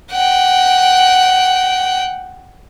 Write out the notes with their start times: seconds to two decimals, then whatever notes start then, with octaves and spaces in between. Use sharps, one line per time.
0.11 F#5 G5